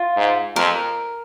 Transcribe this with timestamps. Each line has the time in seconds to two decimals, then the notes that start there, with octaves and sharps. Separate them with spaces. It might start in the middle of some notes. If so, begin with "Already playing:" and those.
Already playing: F4
0.17 G#2
0.56 F2 A#4